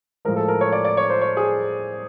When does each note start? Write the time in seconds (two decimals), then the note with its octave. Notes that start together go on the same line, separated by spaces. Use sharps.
0.25 A2 F3 G#3 A#4
0.36 A4
0.48 A#4
0.61 C#5
0.72 D5
0.85 D5
0.97 C#5
1.10 C5
1.21 C#5
1.37 G#4